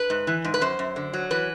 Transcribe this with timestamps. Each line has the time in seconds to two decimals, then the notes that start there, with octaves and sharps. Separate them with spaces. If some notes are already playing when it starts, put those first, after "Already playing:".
Already playing: B4
0.10 G#2
0.27 E3
0.45 G#2
0.54 B4
0.61 F#2 C5
0.79 F#2
0.96 D3
1.14 F#3
1.31 E3 B4